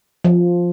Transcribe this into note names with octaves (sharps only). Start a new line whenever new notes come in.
F3